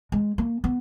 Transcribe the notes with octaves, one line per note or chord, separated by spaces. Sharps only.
G#3
A#3
B3